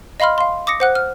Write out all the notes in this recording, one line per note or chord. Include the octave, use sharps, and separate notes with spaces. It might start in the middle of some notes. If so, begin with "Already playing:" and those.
D#5 F5 B5 C6 F6
F5 C6
D6 D#6 A#6 C#7
C5 F#5 F#6
F6